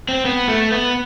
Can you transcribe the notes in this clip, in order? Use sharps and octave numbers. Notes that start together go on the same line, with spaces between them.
C4
B3
A3
B3